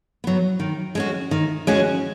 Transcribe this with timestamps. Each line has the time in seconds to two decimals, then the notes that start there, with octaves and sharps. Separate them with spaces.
0.24 F#3 B3
0.60 D#3
0.95 G#3 C#4 F#4
1.31 D#3
1.67 G#3 C#4 F#4